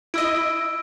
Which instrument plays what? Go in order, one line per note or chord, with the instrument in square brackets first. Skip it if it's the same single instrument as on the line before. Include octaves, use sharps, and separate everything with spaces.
[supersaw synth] E4 D#5 [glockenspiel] E6 D7